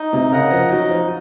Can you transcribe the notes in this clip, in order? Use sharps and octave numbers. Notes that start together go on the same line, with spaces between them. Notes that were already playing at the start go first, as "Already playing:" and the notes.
Already playing: D#4
C3
C#3 A#4 D#5 F#5
F3
F#3 D#4
F3